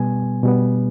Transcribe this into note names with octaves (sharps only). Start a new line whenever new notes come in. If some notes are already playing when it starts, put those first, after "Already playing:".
Already playing: B2 G3 B3 G#5
B2 G3 B3